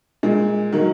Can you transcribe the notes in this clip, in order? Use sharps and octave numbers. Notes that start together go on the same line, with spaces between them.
A#2 G#3
D#3 F#3 A#3